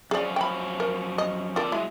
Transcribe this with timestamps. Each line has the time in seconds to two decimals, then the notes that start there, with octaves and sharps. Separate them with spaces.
0.11 F#2 F3 C#4 G#4 D5
0.36 G5 B5
0.80 A#4
1.18 D#5
1.56 F2 F4 A4 A#4 D5
1.72 F#3 G#3 E4